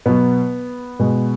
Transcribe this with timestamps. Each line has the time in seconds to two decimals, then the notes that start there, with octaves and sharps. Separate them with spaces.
0.06 B2 F#3 B3
1.00 B2 G#3